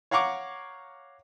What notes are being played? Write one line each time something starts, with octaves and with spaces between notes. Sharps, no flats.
C#5 F5 F#5 A#5 C#6 D6